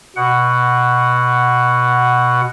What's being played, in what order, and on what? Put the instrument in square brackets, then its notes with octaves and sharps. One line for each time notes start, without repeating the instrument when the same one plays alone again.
[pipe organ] B2 F#5